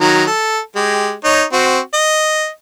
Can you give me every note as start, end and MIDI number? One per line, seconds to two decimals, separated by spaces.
0.01 0.25 51
0.01 0.25 54
0.01 0.25 82
0.27 0.59 69
0.76 1.13 56
0.76 1.13 67
1.24 1.43 63
1.24 1.43 73
1.53 1.79 60
1.53 1.79 66
1.93 2.48 75